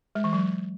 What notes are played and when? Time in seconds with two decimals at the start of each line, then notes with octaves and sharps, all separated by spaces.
0.15 G#3
0.24 E3
0.33 F#3